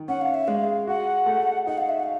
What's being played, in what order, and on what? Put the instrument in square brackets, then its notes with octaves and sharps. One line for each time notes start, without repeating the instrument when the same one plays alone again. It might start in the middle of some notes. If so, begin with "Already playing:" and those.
Already playing: [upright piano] D#3
[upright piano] C#4 [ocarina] F#5
[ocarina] F5
E5
[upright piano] G#3 [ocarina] F5
[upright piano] F#4 [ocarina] F#5
[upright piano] A3
[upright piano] D#4 [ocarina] F#5
[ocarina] F5
E5
F#5
F5